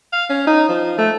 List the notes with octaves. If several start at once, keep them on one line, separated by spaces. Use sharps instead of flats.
F5
C#4
D#4
F3
A3